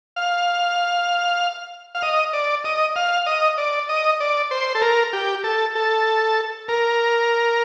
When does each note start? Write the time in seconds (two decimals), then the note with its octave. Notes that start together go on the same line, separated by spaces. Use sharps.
0.16 F5
1.95 F5
2.02 D#5
2.33 D5
2.64 D#5
2.96 F5
3.26 D#5
3.58 D5
3.89 D#5
4.20 D5
4.51 C5
4.75 A4
4.82 A#4
5.13 G4
5.44 A4
5.75 A4
6.68 A#4